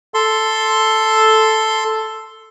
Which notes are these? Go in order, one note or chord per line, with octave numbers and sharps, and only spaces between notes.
A4 C6